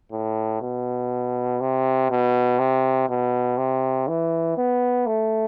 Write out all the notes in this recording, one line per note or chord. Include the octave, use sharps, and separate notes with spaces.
A2
B2
C3
B2
C3
B2
C3
E3
B3
A3